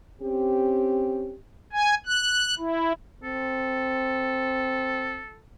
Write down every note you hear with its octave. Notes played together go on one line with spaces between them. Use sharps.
C4 C#4 G4
G#5
F#6
E4
C4 A4